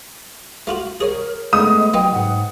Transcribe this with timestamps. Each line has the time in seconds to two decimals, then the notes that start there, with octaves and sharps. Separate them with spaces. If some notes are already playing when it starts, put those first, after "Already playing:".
0.67 A3 F4 F#4
1.01 G#4 A#4 C#5 G#5
1.53 G#3 A3 B3 D#5 D#6
1.94 F#3 A#3 B3 D#4 G5
2.12 B1 G#2 F#5